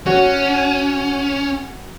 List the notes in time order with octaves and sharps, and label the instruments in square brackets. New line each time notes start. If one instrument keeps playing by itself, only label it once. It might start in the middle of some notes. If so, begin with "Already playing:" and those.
[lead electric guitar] C#4 [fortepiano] F#4